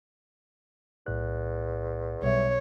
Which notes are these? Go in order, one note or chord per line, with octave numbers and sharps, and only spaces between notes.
B1 E2 A2 F#6
B1 G3 C#5 E5